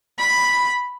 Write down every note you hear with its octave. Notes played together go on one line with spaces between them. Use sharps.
B5